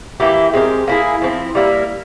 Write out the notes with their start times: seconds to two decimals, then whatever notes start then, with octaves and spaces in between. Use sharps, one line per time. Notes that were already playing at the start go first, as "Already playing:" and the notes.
0.20 E3 A#3 E4 G4
0.53 G#3 C4 G4 A#4
0.87 A#3 E4 G#4
1.22 F3 C4 E4
1.55 G3 A#3 E4 A#4